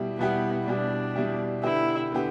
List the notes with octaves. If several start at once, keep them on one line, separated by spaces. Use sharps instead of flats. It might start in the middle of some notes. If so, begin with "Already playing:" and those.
Already playing: B2 G3 E4 G4
B2 G3 B3 E4 G4
B2 G3 D4 E4 G4
B2 G3 E4 G4
D3 B3 E4 G4
D3 B3 G4